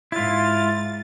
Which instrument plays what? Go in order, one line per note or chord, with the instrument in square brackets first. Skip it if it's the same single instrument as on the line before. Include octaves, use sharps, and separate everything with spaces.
[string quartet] G#2 A6 [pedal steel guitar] E4 F4